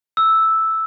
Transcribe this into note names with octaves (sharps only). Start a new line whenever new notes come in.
E6